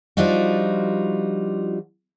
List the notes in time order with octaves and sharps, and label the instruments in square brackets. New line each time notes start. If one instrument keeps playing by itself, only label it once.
[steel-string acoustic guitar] F3 G3 D4 D#4 F4 F#4